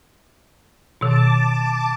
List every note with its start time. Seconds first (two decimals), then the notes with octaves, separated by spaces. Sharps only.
1.01 B2 D#3 A5 D6